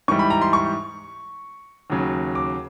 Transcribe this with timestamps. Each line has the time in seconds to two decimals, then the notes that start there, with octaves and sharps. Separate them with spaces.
0.08 G#2 E3 G3 C#6
0.19 B5
0.30 A#5
0.41 C6
0.53 C#6
1.90 D#2 C#3 F#3
2.35 D6